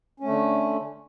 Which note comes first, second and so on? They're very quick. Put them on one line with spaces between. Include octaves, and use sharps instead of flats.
C#4 A3 D3